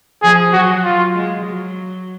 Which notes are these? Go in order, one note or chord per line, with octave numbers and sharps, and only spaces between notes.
F3 G#4
F#3 F#4
F4
G#3
F#3